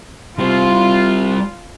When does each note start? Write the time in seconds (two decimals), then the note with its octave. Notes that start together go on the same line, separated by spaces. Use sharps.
0.39 G3 C4 F4